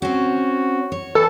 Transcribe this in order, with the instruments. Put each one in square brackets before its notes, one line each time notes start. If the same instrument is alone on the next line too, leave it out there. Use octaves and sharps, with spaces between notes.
[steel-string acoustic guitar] C4 C#4 [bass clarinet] F#4
[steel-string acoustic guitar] C#5
[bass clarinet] E3 [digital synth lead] A4